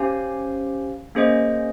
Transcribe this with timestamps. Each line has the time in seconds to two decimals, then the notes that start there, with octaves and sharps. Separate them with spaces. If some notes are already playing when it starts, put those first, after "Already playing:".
Already playing: C#4 G4 C5 F5 G#5
1.15 A#3 C#4 G#4 C5 D#5